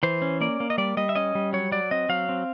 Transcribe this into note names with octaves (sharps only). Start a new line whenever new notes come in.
E3 C5
C#4
A#3 D5
A#3
D#5
G3 D5
G3 D#5
E5
C#4 D#5
G3
F#3 C#5
F#3 D5
C4 D#5
F#3 F5
C4